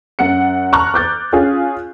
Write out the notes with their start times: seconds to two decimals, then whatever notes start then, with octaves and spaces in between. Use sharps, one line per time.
0.19 F#2 F#5 C#7
0.73 A5 A#5 C#6 F6 F#6
0.94 D6 G6 A6
1.33 C#4 F4 G#4